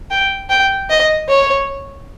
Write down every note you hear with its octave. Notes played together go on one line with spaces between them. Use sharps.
G5
G5
D#5
C#5